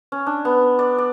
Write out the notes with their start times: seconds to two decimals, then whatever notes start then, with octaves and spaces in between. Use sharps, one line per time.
0.12 C#4
0.27 D4
0.45 B3
0.79 D5
0.98 D5